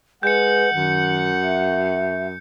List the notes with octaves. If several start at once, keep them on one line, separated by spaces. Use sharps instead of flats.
G#3 B4 F#5 G6 C#7
F#2 D#3
E5